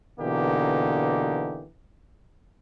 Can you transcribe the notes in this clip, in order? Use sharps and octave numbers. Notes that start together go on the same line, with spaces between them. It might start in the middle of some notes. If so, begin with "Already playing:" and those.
B2 D3 E3 A#3 D#4 G4